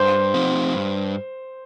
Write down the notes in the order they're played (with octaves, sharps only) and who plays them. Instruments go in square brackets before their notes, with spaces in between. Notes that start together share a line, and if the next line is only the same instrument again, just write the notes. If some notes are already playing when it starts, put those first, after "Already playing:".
Already playing: [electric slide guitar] G2 [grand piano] C5
[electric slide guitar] F3 C4 D#4
G2